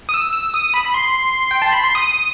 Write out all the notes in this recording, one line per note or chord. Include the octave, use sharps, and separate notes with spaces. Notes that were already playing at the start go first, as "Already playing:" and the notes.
D#6
E6
E6
D#6
B5
B5
C6
G5
A5
B5
C6
D#6